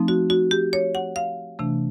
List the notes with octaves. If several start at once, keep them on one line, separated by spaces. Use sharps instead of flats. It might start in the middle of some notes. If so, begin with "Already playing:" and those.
Already playing: F3 A3 C4 D#4
F#4
F#4
G4
C#5
F#5
F5
C3 E3 A3 D4